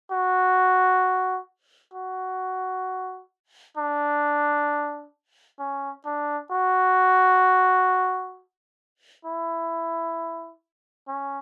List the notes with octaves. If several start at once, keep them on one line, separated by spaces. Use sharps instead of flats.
F#4
F#4
D4
C#4
D4
F#4
E4
C#4